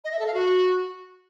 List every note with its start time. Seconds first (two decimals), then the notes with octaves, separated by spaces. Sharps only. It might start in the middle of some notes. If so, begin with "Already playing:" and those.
0.04 D#5
0.11 E5
0.19 A4
0.26 F5
0.34 F#4